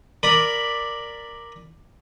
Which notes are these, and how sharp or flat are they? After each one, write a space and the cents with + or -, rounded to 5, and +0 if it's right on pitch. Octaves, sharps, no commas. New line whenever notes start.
A#4 +0 D5 +5 B5 +0